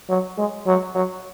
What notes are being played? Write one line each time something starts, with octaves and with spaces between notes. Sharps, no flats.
F#3
G#3
F#3
F#3